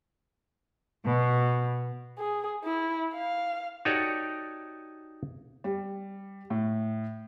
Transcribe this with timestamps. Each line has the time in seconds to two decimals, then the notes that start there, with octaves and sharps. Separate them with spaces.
1.05 B2
2.18 G#4
2.64 E4
3.14 F5
3.85 D#4 F#4 G4 A4 C#5 D5
5.64 G3
6.50 A2